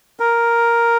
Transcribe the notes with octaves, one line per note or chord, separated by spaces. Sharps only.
A#4